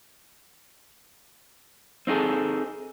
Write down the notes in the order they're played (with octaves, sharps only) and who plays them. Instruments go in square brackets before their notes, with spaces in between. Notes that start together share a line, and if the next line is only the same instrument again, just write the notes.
[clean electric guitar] C4 D#4 F4 G#4 A4